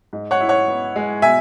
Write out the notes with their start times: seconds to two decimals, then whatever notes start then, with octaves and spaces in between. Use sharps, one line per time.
0.13 G#2
0.31 C#5 F#5
0.40 E4
0.49 C#5 F#5
0.68 B3
0.96 G#3
1.22 B2 E5 G#5